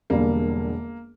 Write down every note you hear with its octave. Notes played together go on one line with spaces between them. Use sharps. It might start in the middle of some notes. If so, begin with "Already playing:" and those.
E1 E2 D3 G3 A#3